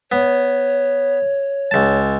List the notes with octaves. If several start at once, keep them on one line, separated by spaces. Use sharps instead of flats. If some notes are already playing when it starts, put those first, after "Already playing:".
B3 C#5
C#2 A5